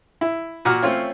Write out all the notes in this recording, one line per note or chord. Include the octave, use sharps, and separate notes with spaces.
E4
A#2 F#4 D6 F6
A3 C4 C#4 F4 C#5